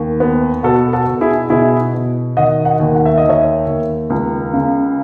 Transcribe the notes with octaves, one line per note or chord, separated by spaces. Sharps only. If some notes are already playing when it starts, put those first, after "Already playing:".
Already playing: D#2
B3
B2 F#4 A4
F#4 A4
B2
E4 G#4
B2 E4 G#4
B2
D#3 D#5 F#5
D#5 F#5
D#2
F#5
E5
D#5
D#3
C#5 E5
D#2
C#2
C#3